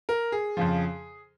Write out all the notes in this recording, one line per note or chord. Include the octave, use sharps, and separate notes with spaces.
A#4
G#4
F2 C#3 F3